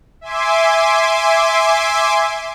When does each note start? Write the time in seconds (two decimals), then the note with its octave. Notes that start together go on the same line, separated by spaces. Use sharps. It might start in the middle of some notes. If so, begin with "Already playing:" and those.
0.21 E5 G#5 C6 D6